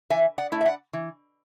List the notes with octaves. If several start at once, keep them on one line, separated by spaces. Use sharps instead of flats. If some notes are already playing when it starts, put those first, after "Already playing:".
E3 E5 G#5
D5 F#5
A3 E4
E5
D5 F#5
E3